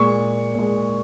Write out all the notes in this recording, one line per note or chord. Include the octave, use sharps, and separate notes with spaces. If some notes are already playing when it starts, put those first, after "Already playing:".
Already playing: A#2 G#3 C#6
A#2 G#3